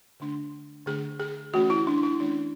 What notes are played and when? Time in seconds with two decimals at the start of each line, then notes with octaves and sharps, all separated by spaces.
0.20 D3 A3 D4
0.86 D3 A3 D4 G#4
1.20 G#4
1.53 E3 A3 C#4 F#4
1.70 E4
1.87 D4
2.03 E4
2.20 E3 A3 C#4 D4